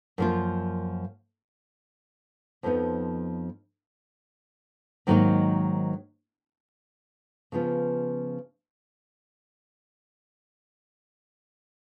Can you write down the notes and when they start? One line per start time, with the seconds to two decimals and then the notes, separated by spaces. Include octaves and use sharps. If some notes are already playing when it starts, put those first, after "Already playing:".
0.18 F#2 F3 A#3 F4
2.63 F2 F3 B3 D#4
5.07 G#2 D#3 F#3 A#3 D#4
7.52 C#3 F3 B3 F4